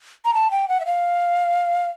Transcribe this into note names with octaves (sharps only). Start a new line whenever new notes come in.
A#5
A5
G5
F#5
E5
F5